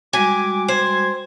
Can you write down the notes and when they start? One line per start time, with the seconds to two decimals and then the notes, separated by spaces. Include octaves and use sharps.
0.13 G3 G#3 F#4 G#5 D6
0.68 C5 G#6